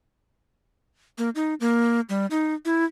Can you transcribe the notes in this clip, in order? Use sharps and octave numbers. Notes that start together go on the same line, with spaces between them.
A#3
D#4
A#3
G3
D#4
E4